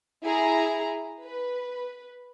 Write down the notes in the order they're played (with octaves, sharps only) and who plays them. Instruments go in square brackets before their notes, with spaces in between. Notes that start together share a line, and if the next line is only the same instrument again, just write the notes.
[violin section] E4 G#4 A#5
B4